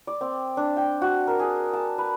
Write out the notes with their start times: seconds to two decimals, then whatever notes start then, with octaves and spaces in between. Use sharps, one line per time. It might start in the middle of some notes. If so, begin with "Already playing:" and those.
0.07 D5
0.21 C4
0.57 D4
0.77 G5
1.02 F#4
1.27 A#4
1.39 G#4
1.73 A5
1.98 B4